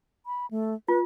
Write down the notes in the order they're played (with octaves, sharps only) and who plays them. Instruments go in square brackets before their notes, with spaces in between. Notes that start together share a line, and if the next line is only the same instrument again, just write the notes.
[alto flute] B5
A3
[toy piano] F4 [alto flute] B4